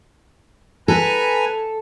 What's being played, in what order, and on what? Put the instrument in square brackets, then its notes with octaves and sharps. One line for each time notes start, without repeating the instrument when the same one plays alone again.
[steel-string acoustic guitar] A4 [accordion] B4 G#5 A#5